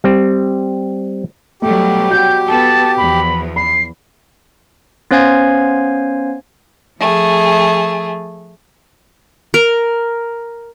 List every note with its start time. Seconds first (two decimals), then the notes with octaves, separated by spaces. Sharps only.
0.04 G3 C4
1.62 B2 F#3 G3 A3 G4
2.11 F#4 G5 G6
2.48 B3 A4 A5
2.97 E2 F3 B5
3.56 B5 C7
5.11 B3 C#4 C5 F5 G#5 G#6
7.00 F3 A3 G#4
9.54 A#4